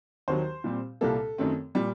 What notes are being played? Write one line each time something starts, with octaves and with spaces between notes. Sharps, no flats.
D#2 D#3 F#3 C5
A#2 G3 C4
C2 A#2 G3 A#3 A4
F#2 D#3 A3 C4
A#2 G3